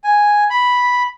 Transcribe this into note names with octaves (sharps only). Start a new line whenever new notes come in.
G#5
B5